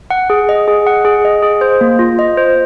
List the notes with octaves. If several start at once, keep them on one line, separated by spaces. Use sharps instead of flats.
F#5
G#4
D#5
G#4
F#5
G#4
D#5
G#4
C5
A#3
F4
D#5
C5